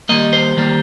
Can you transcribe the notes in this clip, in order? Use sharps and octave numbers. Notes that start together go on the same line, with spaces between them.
D#3 G3 A#3 D#5
C5
D#3 G3 A#3